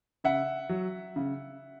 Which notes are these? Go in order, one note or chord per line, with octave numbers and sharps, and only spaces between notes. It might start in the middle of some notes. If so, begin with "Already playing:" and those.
C#3 E5 F#5
F#3
C#3